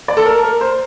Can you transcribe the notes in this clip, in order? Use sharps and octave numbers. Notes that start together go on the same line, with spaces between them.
D5
A4
A#4
A#4
C5